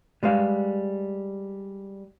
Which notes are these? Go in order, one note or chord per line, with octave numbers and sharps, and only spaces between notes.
G3 G#3 B4 F5